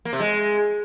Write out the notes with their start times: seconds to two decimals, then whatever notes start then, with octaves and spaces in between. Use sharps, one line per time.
0.05 A#3
0.13 C3
0.20 G#3